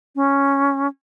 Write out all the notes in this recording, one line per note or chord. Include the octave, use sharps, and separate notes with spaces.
C#4